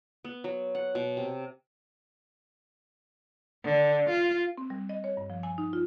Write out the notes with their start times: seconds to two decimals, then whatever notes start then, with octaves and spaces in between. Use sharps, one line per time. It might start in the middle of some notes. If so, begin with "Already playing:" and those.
0.25 B3
0.44 F#3
0.75 F#5
0.95 B2
1.17 C3
3.64 D3
4.09 F4
4.57 C4
4.70 G3
4.89 D#5
5.04 C#5
5.17 G2
5.30 F3
5.43 G#5
5.58 D#4
5.73 F4